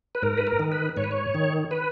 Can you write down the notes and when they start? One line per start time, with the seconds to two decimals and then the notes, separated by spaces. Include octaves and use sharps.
0.15 B4
0.22 G#2 A#4
0.38 B4
0.47 A#4
0.59 D#3
0.72 B4
0.97 G#2 C#5
1.04 B4
1.11 C#5
1.34 D#3
1.71 B4